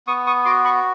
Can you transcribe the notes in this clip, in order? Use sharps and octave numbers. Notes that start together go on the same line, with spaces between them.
B3 C#6 D#6
C#6 D#6
F#4 C6 D6
B5 C#6